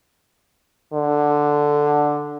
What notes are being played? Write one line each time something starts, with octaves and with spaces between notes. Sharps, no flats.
D3